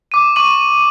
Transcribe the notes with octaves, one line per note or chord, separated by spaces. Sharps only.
D6 D#7
C#6 D6 D#7 F#7